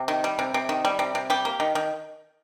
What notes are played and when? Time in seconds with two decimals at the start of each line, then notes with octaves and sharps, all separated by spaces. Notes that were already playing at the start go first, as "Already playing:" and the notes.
Already playing: C3
0.08 D#3
0.24 G3
0.39 C3
0.54 C3
0.69 D#3
0.85 G3
0.99 C3
1.15 C3
1.30 G3 G4
1.45 A#3
1.60 D#3
1.75 D#3